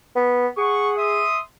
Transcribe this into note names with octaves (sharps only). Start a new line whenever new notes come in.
B3
G#4 F#5 C#6
E5 C6 D#6